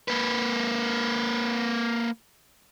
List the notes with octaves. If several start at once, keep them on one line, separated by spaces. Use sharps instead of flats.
A#3 B4